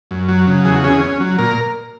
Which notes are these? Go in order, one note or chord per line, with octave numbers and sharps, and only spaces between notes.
F#2
F#3
C#3
E2 G#4
F#4
C#4 G#4
C#4
F#3
A#2 A#4